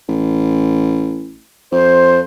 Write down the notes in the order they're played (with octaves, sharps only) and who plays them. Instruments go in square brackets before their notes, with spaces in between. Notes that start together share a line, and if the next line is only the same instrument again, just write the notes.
[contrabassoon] A1
[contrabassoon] F2 [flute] C5